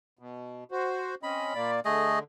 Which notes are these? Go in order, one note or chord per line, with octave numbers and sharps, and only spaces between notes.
B2
F#4 C5
C4 C#4 D#5 B5
A#2 A#3 D5
D3 A3 G#4 D#5